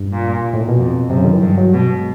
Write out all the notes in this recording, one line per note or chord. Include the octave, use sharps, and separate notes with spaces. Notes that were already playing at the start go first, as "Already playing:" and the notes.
Already playing: G2
A#2
A2
A#2
B2
F2
F#2 C3
C#3
D#3
E3
G2
F#3
B2 G#3